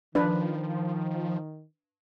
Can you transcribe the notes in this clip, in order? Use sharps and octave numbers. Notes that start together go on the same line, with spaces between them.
D#3 F3 D4 B4